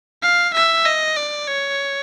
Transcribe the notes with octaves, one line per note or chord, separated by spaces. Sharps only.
F5
E5
D#5
D5
C#5